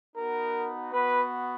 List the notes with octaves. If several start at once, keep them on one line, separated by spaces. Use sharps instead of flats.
B3 D#4 F#4 A#4
B3 F#4 B4